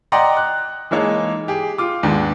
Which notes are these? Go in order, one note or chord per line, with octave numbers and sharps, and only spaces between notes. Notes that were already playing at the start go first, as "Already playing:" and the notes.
D5 D#5 F#5 G5 A#5 C6
F#6
E3 G#3 A#3 D#4 A4 C#5
G4 G#4
F4 D6
D#2 G#2 B3 D4